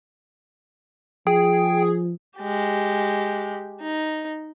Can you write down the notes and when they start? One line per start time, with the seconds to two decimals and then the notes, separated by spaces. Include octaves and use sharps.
1.27 F3 G#4 G5
2.38 G#3 G4
3.81 D#4